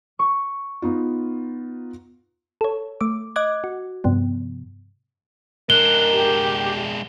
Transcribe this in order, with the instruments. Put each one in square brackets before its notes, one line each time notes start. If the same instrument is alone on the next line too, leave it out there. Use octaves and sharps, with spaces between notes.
[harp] C#6
[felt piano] B3 D#4 F4
[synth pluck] A4 C#5
A3 D6
D#5 D6 F#6 G#6
F#4
G2 C3 F3 B3
[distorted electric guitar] G#3 D4 [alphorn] A#4 [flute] F#6 [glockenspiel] G7
[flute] G4